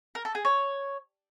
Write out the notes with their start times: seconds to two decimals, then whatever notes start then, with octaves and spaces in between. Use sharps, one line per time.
0.15 A#4
0.25 A4
0.35 G#4
0.45 C#5